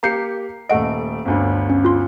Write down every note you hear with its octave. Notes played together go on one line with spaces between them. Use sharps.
A#3 G4 A#5 G6 C7 C#7
D#1 A3 D#5 F#5 D7
G1 D2 D3
C#4
F4 C6